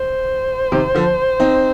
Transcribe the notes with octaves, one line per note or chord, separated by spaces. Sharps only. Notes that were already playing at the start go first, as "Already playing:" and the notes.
Already playing: C5
C3 D#3
D3 F3
C4 D#4